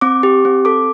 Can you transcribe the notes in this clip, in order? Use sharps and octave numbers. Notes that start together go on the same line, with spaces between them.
C4 D6
G4
C4
A4 D6